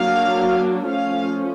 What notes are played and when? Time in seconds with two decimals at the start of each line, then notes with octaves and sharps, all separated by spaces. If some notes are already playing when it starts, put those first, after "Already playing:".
Already playing: F#3 A#3 D4 F5
0.88 F3 A3 C#4 F5